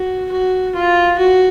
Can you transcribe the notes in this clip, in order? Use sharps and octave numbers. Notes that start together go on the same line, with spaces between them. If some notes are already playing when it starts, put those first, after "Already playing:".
Already playing: F#4
F#4
F4
F#4